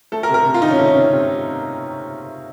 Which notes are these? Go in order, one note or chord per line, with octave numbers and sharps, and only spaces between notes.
A3 A4
A#4
C3
A#4
C3
F4
D#3 D#4
C#4
A3 D#4
C#4
C3
C3